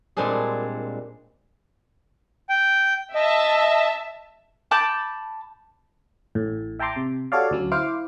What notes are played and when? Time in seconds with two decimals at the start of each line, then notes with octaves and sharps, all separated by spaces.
0.17 A#2 G3 G#3 C4 D4 G#4
2.49 G5
3.15 D#5 E5 A5
4.71 A5 B5 D6 G6
6.35 A1 A2
6.79 E5 G5 A5 A#5 C6 D6
6.96 C3
7.32 F#4 G4 A4 C#5 D5 F5
7.51 D2 F#3 C#4
7.72 E4 C5 F5 D6